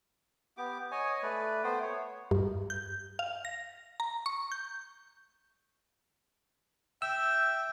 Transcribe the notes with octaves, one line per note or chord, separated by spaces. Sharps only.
B3 G4 D6
C#5 D#5 G#5
A3 B4 D5
A3 B3 C5 G5
C#5
G2
G6
F5
A#6
A#5
C#6
G6
E5 G5 E6